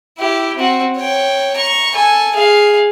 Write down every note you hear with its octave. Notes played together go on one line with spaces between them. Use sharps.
E4 G4
C4 F#4
C#5 G5
A#5 C#6
A4 G#5
G#4 F5